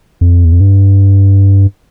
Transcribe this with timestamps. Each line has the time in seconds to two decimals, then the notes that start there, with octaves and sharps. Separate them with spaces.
0.21 F2
0.45 E2
0.52 F2
0.61 G2